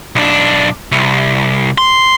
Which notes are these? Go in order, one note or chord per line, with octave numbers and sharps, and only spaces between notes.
B1 D4
C2
C6